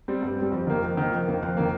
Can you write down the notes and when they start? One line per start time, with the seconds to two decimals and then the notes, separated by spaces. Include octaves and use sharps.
0.08 G3 C4
0.23 G2
0.37 C4
0.42 G3
0.52 F2
0.67 D#3 A#3
0.83 F2
0.97 D#3 A#3
1.12 F2
1.27 D#3 A#3
1.43 F2
1.57 D#3 A#3